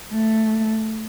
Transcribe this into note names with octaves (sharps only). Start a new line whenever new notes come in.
A3